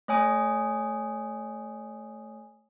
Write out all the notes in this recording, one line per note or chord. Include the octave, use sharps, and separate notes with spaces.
A3 C#5 G#5 D#6